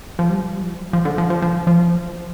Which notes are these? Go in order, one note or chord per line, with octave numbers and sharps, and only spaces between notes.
F3
G3
F3
G3
F3
F3
D3
F3
F3
F3
F3